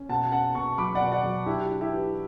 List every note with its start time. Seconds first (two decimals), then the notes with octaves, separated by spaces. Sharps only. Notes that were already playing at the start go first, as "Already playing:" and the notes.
Already playing: C#4
0.09 B2 F#5 A5
0.32 C#4 F#5 A5
0.55 B2 A5 C#6
0.78 F#3 B5 D6
0.95 D5 F#5
1.01 B2
1.12 D5 F#5
1.23 F#3
1.46 D4 E4 G4
1.69 D4
1.81 E4 G4
1.92 E3